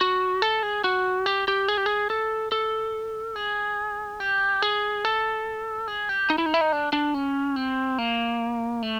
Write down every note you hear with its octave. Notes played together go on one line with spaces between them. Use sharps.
F#4
A4
G#4
F#4
G4
G4
G#4
G4
G#4
A4
A4
G#4
G4
G#4
A4
G#4
G4
D#4
E4
D#4
E4
D#4
D4
D4
C#4
C4
A#3
A3